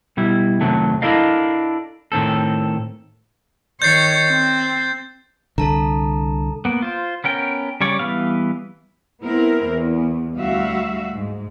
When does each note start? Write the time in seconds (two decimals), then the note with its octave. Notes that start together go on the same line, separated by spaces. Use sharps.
0.17 B2 G3 E4
0.61 C3 D#3 F#3 A3
1.02 D4 E4 A4 A#4 D#5 F5
2.12 A2 D#3 C4 A4
3.82 D#3 C#5 G6 A6 C7
4.29 C4
5.58 C2 D3 A4 A5 A#5
6.65 A#3 B3
6.82 F4 C5
7.24 B3 C#4 A#4 G5
7.81 C#3 G3 C#5 D5
7.99 E3 G3 B3 F5
9.22 B3 C4 E4 A#4
9.69 E2
10.37 D2 G3 F#4 E5 F5
11.13 G#2